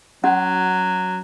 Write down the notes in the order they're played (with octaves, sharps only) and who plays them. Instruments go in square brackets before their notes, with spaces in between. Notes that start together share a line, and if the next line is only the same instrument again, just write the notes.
[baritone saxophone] F#3 [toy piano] C#4 F#4 F#5